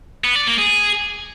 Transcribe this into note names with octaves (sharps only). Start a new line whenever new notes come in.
B3
D5
A#3
G#4